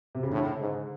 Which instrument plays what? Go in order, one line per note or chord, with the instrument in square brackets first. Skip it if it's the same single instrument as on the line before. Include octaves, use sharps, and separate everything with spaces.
[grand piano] C3
C#3
[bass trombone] A2 [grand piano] D3
[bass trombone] G#2